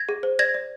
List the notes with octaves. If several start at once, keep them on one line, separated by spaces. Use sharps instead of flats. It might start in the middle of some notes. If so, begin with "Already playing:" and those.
Already playing: G#6 A#6
G#4
C5
D5 G#6 A#6
D5